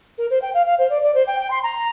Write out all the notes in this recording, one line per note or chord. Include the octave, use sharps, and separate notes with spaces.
A#4
C5
G5
F5
F5
C5
D5
D5
C5
G5
G5
C6
A#5